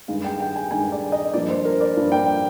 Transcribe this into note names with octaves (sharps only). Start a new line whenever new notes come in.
G2 D#3 G#3 F5
G5
G5
G#5
G2 D#3 G#3 G#5
D5
D#5
G2 F3 A#3 D4 D5
C5
A#4
D5
G2 F3 A#3 D4
G5